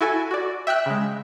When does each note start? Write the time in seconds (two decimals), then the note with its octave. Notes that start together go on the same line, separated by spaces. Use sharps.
0.01 E4 F#4 A4 G#5
0.31 F#4 D5
0.67 E5 G5 E6 F#6
0.86 C#3 G#3